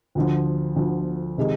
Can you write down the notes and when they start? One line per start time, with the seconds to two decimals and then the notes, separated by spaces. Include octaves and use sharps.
0.15 D2 D3 F3
0.76 D2 D3 F3
1.38 C3 D#3 G#3